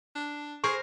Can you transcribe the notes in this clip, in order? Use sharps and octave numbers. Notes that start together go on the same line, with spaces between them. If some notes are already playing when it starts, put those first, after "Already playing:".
D4
G#4 A#4 C5 C#6